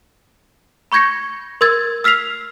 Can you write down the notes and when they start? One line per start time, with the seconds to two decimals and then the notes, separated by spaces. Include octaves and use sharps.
0.92 B5 C#6 G6 G#6 A#6 C#7
1.61 A#4 C6 E6 G#6 A6
2.04 E6 F6 B6 C7 F7